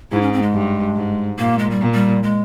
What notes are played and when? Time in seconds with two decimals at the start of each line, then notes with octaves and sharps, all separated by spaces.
0.12 G#2 E4
0.22 C#4
0.33 C4
0.42 G#3
0.53 G2
0.96 G#2
1.39 A#2 A#3
1.59 G#3
1.70 G3
1.81 A#2
1.94 G3
2.23 G#3